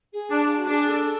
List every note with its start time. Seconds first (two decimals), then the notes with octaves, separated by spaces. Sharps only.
0.12 G#4
0.30 D4
0.45 F4
0.57 F#4
0.68 D4 G#4
0.88 A4